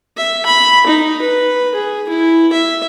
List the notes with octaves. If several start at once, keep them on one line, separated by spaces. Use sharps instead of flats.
E5
B5
D#4
B4
G#4
E4
E5